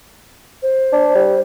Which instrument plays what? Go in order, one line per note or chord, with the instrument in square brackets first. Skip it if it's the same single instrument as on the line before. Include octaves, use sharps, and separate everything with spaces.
[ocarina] C5
[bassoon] D4
G3